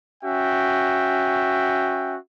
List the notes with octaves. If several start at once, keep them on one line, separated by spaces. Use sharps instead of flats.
C#4 F#4 E5 G5